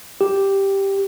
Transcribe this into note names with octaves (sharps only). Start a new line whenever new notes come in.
G4